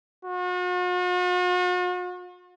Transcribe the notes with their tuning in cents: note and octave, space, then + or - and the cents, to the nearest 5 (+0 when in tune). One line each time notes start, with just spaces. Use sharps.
F#4 -45